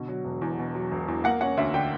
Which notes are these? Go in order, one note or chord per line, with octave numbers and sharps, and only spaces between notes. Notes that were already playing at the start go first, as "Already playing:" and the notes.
Already playing: B2 D3
F#3
E1
E2
B2
F#3
E1
E2
A#3 F#5
C#4 F#5
D2 E5
D3 G5